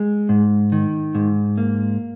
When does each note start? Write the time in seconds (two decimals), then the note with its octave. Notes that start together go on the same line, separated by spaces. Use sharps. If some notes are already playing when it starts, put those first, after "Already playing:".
Already playing: G#3
0.29 G#2
0.72 D#3
1.15 G#2
1.58 A#3